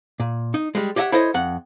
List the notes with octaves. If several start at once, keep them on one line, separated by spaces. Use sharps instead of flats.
A#2
D#4
G3 G#3
G4 C#5 D#5 E5 F#5
E4 A4 C5 C#5 D#5
F2 F#5